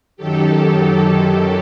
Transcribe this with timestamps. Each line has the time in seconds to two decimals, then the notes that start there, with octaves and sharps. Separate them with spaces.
0.17 F#2 D#3 F#3 G4 A4